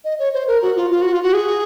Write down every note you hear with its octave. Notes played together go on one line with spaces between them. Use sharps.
D#5
C#5
C5
A#4
F#4
F4
F4
F#4
F4
F#4
G#4